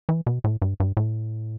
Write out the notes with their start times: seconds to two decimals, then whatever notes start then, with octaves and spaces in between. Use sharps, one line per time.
0.09 E3
0.27 B2
0.44 A2
0.62 G2
0.80 G2
0.97 A2